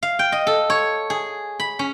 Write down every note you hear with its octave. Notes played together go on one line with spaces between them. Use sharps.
F5
G5
D#5
A4
C#5
G#4
B5
C#4